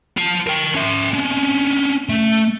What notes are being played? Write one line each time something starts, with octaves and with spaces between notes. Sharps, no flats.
F4 A5
A#4 G5
C#4 E5
C#4 D4
A3